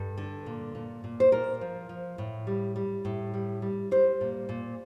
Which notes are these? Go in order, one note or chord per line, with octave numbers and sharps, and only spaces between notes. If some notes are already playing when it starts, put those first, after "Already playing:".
Already playing: G2 A4
D3
A#2
A#2
A#2
C5
A#2 A#4
F3
F3
A2
G3
G3
A2
G3
G3
G3 C5
A#2
A#2